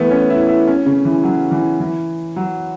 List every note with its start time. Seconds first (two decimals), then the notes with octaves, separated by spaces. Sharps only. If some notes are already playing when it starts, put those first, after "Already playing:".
Already playing: E3 A3 B3
0.11 C#4
0.30 E4
0.49 E4
0.68 C#4
0.86 C#3
1.05 E3
1.24 F#3
1.51 E3
1.80 E3
2.36 F#3